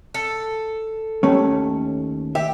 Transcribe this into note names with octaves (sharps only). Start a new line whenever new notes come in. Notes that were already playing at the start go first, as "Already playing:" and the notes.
A4
D#2 A3 C#4
G4 E5